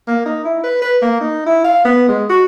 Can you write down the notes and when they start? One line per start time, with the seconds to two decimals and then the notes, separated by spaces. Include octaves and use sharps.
0.08 A#3
0.26 D#4
0.45 E4
0.64 B4
0.82 B4
1.02 A#3
1.21 D#4
1.46 E4
1.64 F5
1.85 B3
2.08 G#3
2.30 F#4